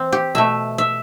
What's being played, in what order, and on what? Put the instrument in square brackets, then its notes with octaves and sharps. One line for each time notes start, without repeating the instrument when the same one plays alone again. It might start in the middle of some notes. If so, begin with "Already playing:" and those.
Already playing: [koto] E3 C4
G4
B2 A3 E5
E5